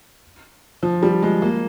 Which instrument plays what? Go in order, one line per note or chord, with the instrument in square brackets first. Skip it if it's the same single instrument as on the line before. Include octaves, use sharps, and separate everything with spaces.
[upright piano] F3
G3
G#3
A#3